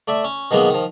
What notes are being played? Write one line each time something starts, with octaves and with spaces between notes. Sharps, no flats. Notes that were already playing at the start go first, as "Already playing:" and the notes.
A3 D5 E5
C#4
B2 D#3 F#3 G#3 A#3 B3
D#3 F3